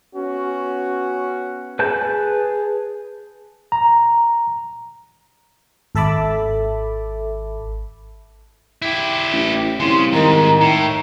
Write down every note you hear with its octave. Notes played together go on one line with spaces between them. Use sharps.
B3 C#4 F#4
G#4 B4 A5 G6
A#5
G#1 A4 E5 A5 B5 D6
E4 G4
A1
C2 C#3 C6
G#2 D#3 A#5
A2